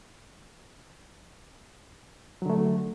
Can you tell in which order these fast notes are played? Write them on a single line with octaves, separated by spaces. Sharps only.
F#3 D3 A3